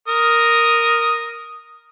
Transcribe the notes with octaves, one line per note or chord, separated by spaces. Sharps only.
A#4 D#6